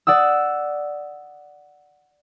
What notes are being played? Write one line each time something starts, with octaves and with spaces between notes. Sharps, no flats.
D5 F#5 D#6 E6